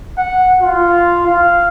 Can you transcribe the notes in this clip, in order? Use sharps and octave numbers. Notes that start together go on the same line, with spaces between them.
F#5
F4
F5